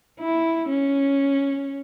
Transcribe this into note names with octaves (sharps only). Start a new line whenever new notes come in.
E4
C#4